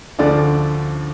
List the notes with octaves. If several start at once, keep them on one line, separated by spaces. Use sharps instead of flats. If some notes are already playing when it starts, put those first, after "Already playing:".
D2 D3 F3 D5